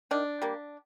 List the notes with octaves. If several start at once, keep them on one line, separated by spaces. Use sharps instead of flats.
D#3 D4
G3 A#3